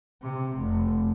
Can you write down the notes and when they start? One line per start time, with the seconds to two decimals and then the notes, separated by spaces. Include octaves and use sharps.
0.22 C3
0.57 F1